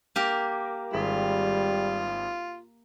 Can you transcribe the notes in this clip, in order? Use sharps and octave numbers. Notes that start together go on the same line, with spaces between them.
A#3 G4 A#4
G#1 G3 F4 G#4 B6